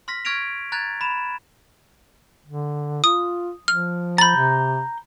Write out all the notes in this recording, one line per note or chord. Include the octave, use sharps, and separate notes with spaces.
C6 F6 A#6 B6
C#6 F6 G#6 A#6 D7 F7
A#5 F#6 G#6 A6 F7
B5 E7
D3
F4 D#6
F3 F6
A#5 B5 G6 A6
C3